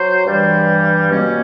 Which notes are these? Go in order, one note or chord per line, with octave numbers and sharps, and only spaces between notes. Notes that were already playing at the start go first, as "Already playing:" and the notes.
Already playing: F#3 C5
G2 E3 G3
B2 G3 A#3 C#4